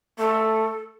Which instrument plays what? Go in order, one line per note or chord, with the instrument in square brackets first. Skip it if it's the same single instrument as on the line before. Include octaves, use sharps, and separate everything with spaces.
[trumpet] A3 [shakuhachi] A4